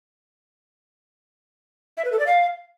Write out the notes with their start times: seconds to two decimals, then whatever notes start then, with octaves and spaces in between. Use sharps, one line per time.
1.97 E5
2.05 B4
2.12 A4
2.19 D5
2.27 F5